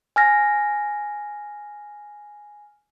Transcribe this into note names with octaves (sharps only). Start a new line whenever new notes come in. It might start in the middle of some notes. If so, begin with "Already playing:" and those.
G#5 F6 A#6